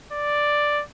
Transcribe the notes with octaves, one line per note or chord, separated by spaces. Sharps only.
D5